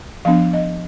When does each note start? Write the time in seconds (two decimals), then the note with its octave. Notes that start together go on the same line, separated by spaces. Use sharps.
0.25 F3 B3 D4 F5
0.53 D#5